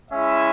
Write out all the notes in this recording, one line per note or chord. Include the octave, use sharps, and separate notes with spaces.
G#3 C#4 E4 E5